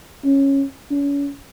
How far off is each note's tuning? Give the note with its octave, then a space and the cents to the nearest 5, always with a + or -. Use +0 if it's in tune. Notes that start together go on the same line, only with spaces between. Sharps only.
C#4 -10
C#4 +35